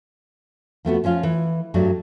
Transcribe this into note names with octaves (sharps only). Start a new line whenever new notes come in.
F3 A3 B3 F#4
F3 C#4 F4 F5
E3
G2 F#3 G3 A3